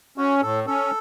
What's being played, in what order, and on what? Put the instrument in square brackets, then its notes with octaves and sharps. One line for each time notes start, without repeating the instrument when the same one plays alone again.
[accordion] C#4 [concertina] F#4
[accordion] A2 [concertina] A4
[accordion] C#4 [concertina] A4